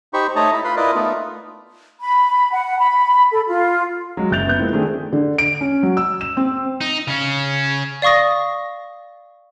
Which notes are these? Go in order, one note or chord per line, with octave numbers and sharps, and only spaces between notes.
D#4 G4 C5 B5 C#6
A3 D#4 C#5 D#5 A5 A#5
E4 B5
F4 B4 B5 C6
E4 F4 A#4 B4 D5 D#5
A3 B3 D#4 F4
B5
F#5
B5
A4
F4
F#3 G#3
F#1 E5 G6 A6 F7
B3 G6
F3 G#3 A#3 C4 E4
D#3 A3 C4 D4 G#4
D3
D7
C#4
F#3
E6
E7
C4
D#4
C#3 C#4
D5 F5 C#6 D#6 A#6